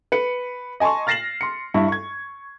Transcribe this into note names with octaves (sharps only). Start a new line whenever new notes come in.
B4 C#7
D#5 G#5 A5 C6 C#6
F6 A6 A#6 C7 E7 F#7
C6 C#7
G2 E4 C#6
C#6 G#6